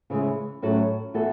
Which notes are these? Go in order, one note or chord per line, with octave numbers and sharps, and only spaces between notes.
C#3 E3 G#3
A2 F#3 C#4 F#4 A4
E3 B3 F#4 A4